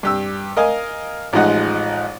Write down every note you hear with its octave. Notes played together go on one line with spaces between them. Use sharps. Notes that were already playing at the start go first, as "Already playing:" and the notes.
G2 G4 E6
A#4 D#5 F5 G#5
A1 F3 G#3 D#4 F#5